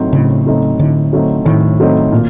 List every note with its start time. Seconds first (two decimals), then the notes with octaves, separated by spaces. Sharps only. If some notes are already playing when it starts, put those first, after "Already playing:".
Already playing: A2 F#3 A3 C4 D#4
0.13 A2 C#3
0.46 F#3 A3 C4 D#4
0.79 A2 D3
1.13 F#3 A3 C4 D#4
1.45 A2 D#3
1.80 F#3 A3 C4 D#4
2.12 A#2